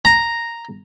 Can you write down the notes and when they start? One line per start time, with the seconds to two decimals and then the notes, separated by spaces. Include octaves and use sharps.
0.05 A#5